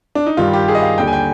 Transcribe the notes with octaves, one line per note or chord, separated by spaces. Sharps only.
D4
D#4
G2 D#3 G3 F4
G4
G#4
D#5
F5
D#2 D3 G3 G5
G#5
G5